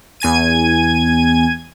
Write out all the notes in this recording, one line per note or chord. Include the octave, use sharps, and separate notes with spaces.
E2 G#5 G#6 D#7